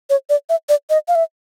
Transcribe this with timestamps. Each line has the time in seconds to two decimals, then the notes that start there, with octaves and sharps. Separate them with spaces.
0.10 C#5
0.30 D5
0.49 E5
0.69 D5
0.90 D#5
1.08 F5
1.15 E5